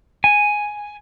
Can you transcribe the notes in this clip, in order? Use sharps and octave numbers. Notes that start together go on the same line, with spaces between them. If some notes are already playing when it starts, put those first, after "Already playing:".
G#5